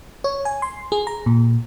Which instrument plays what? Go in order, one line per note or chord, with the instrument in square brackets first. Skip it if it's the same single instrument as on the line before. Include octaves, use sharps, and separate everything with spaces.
[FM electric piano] C#5
G#5
C6
G#4
A#5
A#2